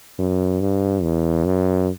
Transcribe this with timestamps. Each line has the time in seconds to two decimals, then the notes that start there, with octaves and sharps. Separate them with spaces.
0.19 F#2
0.60 G2
1.03 E2
1.45 F#2